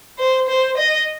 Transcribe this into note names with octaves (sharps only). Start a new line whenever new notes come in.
C5
C5
D#5